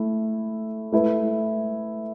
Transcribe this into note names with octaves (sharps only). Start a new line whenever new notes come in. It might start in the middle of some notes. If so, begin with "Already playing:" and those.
Already playing: A3 E4
A3 E4 B4